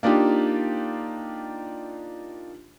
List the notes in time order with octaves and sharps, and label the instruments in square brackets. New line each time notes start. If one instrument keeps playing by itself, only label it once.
[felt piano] A#3 D4 D#4 F4 G4